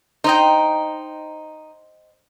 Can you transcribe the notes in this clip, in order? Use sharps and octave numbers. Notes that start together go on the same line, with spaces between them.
D#4 C5 D#5 G5